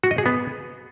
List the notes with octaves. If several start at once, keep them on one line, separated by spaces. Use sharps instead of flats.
F#4
D#5
G#4
B3